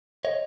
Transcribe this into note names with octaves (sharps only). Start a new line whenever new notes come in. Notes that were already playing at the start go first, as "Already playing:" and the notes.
C#5 D#5